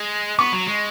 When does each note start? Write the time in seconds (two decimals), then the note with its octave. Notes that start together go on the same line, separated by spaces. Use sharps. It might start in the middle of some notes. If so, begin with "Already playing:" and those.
Already playing: G#3
0.39 B3 C#6
0.53 F#3
0.67 G#3